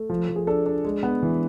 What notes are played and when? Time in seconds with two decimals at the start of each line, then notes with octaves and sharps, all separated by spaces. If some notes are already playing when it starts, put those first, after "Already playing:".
Already playing: A3
0.09 F3
0.29 F3
0.36 G#4
0.47 D4 A4
0.66 D4
0.85 G#3
1.03 B3
1.23 E3